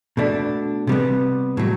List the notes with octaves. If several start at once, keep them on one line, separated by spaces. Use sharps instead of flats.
B2 A3 D4
C3 G3 B3
A2 F#3